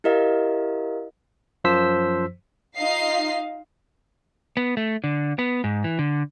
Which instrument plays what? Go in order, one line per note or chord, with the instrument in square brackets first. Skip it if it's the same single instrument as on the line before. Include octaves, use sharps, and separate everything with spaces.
[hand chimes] E4 G4 A#4 D#5 F5
[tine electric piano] F#2 F3 C5 E6 B6
[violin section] D#4 F4 D#5 F5 C7
[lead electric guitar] B3
A3
D3
B3
G#2
E3
D3